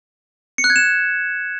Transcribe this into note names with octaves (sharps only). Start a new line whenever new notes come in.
C#7
F#6
G#6
E7